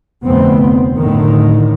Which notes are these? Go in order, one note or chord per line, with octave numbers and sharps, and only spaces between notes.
F1 D2 B3 C4
A2 D3 D#3